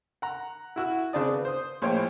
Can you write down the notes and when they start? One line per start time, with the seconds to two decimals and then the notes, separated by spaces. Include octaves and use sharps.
0.22 F#5 A#5
0.76 E4 F#4 E6
1.13 C#3 C4 D4 D5 D#6
1.28 B3
1.45 C5 D#6
1.82 A#1 A2 C5 C#5 G5